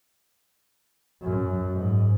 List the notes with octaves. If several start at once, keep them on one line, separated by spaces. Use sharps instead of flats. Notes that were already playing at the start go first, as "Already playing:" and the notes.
F#2
G#2